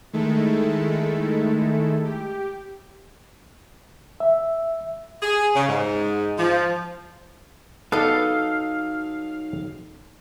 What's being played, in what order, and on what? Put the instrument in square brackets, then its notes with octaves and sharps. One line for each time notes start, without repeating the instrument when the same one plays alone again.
[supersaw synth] D#3 G#3 A3 E4 A4
G4
[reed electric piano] E5
[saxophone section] G#4
C#3
G#2
F3
[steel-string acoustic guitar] F#3 D#4 [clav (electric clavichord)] B3 D4 B4 [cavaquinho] A4 [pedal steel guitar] F5